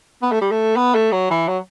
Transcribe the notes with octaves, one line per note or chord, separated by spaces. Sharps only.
B3
A3
G3
A3
B3
A3
F#3
E3
F#3